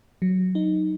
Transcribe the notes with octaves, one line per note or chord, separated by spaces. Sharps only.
F#3
D#4